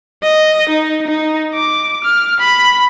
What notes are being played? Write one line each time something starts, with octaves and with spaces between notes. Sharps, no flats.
D#5
D#4
D#4
D6
F6
B5